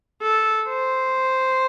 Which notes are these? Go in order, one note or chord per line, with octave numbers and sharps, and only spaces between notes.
A4
C5